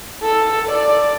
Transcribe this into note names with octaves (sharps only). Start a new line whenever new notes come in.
A4
D5